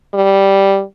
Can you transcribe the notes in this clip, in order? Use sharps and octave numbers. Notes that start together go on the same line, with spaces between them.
G3